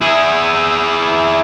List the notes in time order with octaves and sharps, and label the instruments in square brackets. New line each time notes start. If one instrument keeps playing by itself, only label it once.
[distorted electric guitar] E4 G#4